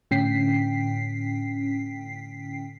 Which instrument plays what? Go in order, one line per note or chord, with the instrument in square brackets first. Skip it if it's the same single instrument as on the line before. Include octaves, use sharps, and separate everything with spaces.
[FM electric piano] A2 D3 C#4 G5 B6 C7